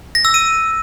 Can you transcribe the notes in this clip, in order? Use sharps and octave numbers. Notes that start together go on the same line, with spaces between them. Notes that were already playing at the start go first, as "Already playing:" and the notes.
A#6
E6
D#7